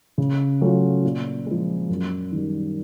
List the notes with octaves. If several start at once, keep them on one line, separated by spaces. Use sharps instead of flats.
C#3
F#3 A3 C#4 F4
A#2
F3 G#3
F#2
D#3 G3